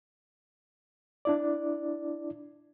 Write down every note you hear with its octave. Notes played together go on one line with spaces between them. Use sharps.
D4 E4 D5